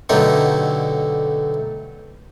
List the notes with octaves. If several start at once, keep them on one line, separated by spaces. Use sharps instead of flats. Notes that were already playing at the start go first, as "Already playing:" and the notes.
B2 D3 F#3 A3 D#4 G4